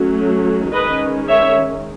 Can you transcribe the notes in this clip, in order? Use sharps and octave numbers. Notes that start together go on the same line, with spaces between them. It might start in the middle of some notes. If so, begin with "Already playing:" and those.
Already playing: F#3 A3 C#4
D#3 G#3 C#4 B4 D#5
C#5 E5